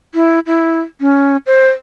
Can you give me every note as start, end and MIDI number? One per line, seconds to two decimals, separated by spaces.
0.14 0.39 64
0.46 0.80 64
1.01 1.37 61
1.47 1.70 72